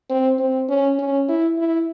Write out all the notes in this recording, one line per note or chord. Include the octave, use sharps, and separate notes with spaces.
C4
C4
C#4
C#4
E4
E4